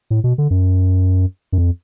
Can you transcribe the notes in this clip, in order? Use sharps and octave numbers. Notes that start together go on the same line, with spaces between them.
A2
B2
D3
F#2
F#2
F2